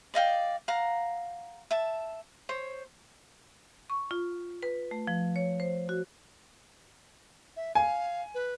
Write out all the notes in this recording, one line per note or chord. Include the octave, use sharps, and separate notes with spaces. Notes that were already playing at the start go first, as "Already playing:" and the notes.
D5 D#5 F5 G5
F5 F#5 A#5
E5 A5
C5 C#5
C#6
F4
B4
A3
F3
C#5
C5
F#4
E5
F5 G#5
B4